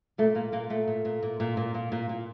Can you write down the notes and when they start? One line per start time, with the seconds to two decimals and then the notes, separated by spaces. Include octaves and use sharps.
0.18 A#2 A3
0.35 A#2 A#3
0.52 A#2 A#3
0.70 A#2 A3
0.88 A#2
1.05 A#2
1.22 A#2
1.40 A#2
1.57 A#2
1.74 A#2
1.92 A#2
2.09 A#2